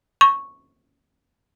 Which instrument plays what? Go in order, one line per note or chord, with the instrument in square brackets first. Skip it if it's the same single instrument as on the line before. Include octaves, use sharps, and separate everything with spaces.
[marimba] C#6